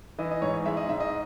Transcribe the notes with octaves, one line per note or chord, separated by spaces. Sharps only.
E3 D#5
D#5
G#2 C#5
G#3 E5
D#5
G#2 E5
D#5